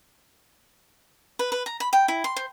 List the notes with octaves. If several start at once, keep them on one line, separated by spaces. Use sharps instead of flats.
B4
B4
A#5
B5
G5
E4
C6
C5